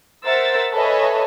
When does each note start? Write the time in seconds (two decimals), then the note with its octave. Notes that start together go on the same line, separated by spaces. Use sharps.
0.24 A#4 C5 E5 F#5 E6 A6
0.72 A4 B4 C#5 D#5 E5 G#5